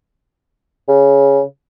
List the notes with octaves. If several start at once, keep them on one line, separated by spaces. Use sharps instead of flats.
C#3